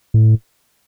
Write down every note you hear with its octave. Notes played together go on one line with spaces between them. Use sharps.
A2